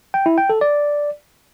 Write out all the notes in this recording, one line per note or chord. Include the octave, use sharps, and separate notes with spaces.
G5
E4
G5
A4
D5